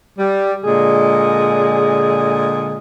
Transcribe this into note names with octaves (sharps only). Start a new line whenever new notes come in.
G3
A#2 D3 G#3 G#4